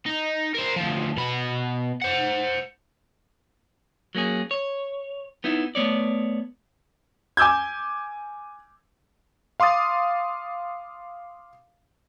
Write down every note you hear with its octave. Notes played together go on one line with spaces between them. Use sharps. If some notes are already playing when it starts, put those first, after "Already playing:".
D#4
A#4 C5
D2 F3
B2 B5
C5 F#5
F#3 A#3 C#4 G#4
C#5
B3 D#4 E4 E5
A3 B3 C#5 D5
G#5 D6 E6 G6 G#6
F5 C6 D6 D#6 A6